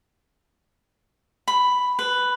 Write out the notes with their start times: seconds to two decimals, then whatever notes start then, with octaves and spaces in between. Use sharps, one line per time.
1.48 B5
1.99 B4